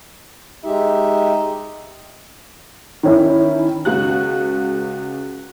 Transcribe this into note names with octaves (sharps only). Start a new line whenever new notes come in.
G#3 D#4 G4 E5
D#3 C#4 E4
C#2 F#4 F#6